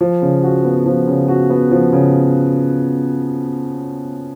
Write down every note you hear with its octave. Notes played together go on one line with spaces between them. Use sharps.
F3
C#3
F#4
B3
F3
C#3
F#4
B3
F3
C#3